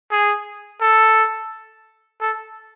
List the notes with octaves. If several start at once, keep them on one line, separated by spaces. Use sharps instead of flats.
G#4
A4
A4